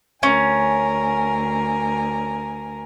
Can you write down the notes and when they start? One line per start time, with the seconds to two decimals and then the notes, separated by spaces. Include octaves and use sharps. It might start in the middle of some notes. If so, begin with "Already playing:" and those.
0.23 D2 C#4 A#4 G#5